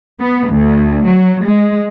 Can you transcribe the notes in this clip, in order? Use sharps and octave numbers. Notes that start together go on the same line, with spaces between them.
B3
D2
F#3
G#3